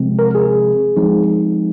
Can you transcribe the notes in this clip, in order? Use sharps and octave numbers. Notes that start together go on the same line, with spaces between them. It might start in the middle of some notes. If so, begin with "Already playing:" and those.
Already playing: C3 F3 G#3 C4
A#4
G#4
F3 G#3 C4 D#4